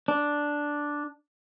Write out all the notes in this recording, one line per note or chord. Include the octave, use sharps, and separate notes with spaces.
D4